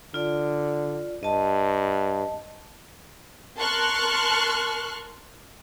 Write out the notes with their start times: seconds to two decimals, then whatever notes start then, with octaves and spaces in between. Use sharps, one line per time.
0.14 D3 F4 D5
1.23 G2 D#5 A5
3.57 A#4 A5 C6 C#6 F6 F#6